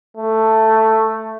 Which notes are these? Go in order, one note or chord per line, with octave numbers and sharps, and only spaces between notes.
A3